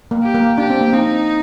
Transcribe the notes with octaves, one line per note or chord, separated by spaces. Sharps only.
A#3
G4
A#3
D4 G4
C4
A#3
C4 D#4